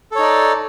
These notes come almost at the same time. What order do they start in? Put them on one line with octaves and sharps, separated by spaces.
A4 C#5 D#4 D5